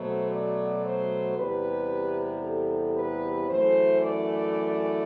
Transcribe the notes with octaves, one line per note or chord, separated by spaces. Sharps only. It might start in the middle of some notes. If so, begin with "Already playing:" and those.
Already playing: B2 F#3 A3 C5
D5
C5
E2 C3 G3 B4
A4
B4
F#2 E3 A3 C5
D5